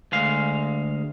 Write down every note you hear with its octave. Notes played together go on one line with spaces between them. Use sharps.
D2 G#3 F5